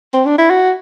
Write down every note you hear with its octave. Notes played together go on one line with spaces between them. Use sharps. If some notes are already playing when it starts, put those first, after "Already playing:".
C4
D4
E4
F#4